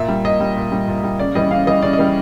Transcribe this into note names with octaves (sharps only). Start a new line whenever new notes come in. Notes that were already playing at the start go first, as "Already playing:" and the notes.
Already playing: A#2 E5
G3
A#2 D#5
G3
A#2
G3
A#2
G3
C#3 D5
E3 G3 D#5
C#3 F5
E3 G3 D#5
C#3 D5
D#5
E3 G3